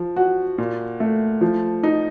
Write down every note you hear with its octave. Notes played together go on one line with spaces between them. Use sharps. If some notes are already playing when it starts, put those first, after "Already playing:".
Already playing: F3
F#4
A#2
A3
F3
D#4